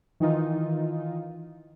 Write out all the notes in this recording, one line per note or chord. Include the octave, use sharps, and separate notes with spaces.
D#3 E3 D#4 F4